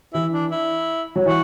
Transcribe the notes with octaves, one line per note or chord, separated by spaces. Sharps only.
E3 E4
D4
E4
F#3
E3 F#4